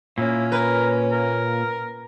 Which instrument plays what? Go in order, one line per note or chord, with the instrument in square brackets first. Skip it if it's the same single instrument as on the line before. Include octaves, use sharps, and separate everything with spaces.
[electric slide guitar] A#2 A#3 [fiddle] C#4 [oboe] E4
[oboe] A#4 [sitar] B4
[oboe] A#4